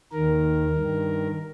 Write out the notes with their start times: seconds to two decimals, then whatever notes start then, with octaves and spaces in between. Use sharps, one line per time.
0.12 D#2 D#3 A#4
0.77 G2 D#3